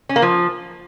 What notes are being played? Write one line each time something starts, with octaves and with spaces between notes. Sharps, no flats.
C#4
A#3
F3